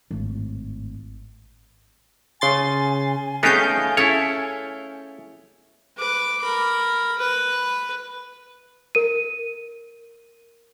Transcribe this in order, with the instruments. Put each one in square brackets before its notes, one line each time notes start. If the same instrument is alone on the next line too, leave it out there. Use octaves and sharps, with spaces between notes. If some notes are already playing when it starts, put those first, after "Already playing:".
[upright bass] G#1 A2
[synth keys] C#3 C6 A6 [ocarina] G#5
[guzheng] A3 C#4 G#4 [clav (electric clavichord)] B3 D#4 G4 [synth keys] F5 G6
[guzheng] C#4 G#4 A4 [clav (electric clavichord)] E4 C#5
[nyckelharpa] B4 D6
A#4 B5
B4
[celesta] A#4 D#7